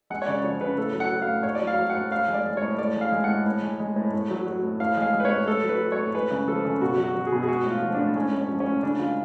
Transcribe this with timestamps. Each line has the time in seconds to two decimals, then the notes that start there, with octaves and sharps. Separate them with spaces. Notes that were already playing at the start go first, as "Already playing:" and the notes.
0.10 G#3 F#5
0.22 C#5
0.27 C#3 D5
0.44 F3 C#5
0.61 C#3 B4
0.78 A2 A4
0.94 F#3
1.00 F#5
1.11 F#3
1.22 F5
1.28 A2
1.43 A2 C#5
1.55 D5
1.61 F#3
1.67 F5
1.78 F#3
1.90 F#5
1.95 A2
2.11 A2 F5
2.28 G#3
2.34 D5
2.46 G#3
2.57 C#5
2.62 A2
2.78 A2 D5
2.96 G#3 F5
3.12 G#3
3.24 A2 F#5
3.46 A2
3.62 G#3
3.80 G#3
3.96 A2
4.13 A2
4.30 F#3
4.47 F#3
4.63 A2
4.80 A2 F5
4.97 G#3 F5
5.14 G#3
5.20 B4
5.25 C#5
5.31 A2
5.47 A2 A4
5.64 F#3
5.69 B4
5.81 F#3
5.92 C#5
5.97 A2
6.14 G#3 B4
6.31 C#3
6.48 F3 A4
6.65 C#3
6.81 B2 F#4
6.98 F#3
7.04 F#4
7.15 F#3
7.27 G#4
7.32 B2
7.43 G#4
7.48 G#3 F#4
7.66 A2 F4
7.83 F3
7.94 A2 D4
8.16 G#3 C#4
8.32 A2
8.38 C#4
8.49 F3
8.60 C#4
8.65 A2
8.83 C#3 D4
8.99 G#3 F4